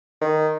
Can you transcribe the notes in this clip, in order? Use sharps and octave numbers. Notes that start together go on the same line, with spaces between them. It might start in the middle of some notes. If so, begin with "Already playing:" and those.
D#3